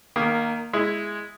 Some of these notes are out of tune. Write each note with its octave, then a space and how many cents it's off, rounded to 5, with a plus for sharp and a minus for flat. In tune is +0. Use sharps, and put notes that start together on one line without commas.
D#3 -20 A#3 +0
G#3 +0 E4 +0